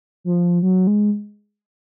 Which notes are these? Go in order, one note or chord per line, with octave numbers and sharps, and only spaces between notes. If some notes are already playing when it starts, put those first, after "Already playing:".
F3
F#3
G#3